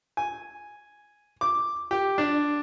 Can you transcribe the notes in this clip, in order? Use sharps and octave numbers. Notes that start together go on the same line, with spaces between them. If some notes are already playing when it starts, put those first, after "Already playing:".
G#5
D6
G4
D4